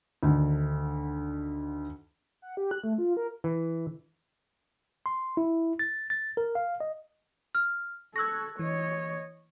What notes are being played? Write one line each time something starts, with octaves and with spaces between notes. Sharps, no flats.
D2 D3 D#3
F#5
G4
F#6
A3
F4
A#4
E3
C6
E4
A6
A6
A#4
F5
D#5
F6
A4 C#6 E6 F#6 G#6 A#6
E3 C#5 D#5